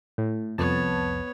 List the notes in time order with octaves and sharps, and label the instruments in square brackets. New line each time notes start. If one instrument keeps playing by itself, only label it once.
[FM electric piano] A2
[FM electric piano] C2 F2 A5 [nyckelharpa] B3 C#5